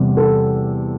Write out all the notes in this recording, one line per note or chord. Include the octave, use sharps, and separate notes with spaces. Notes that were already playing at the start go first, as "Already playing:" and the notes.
Already playing: E2 C3 G3
A4